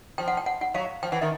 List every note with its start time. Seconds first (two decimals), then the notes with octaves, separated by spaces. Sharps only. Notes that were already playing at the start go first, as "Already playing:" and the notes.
0.18 F3 G5
0.28 F#5
0.37 G5
0.46 F#5
0.61 F#5
0.74 F#3 F5
1.03 F3 G5
1.12 E3 F#5
1.21 D#3 E5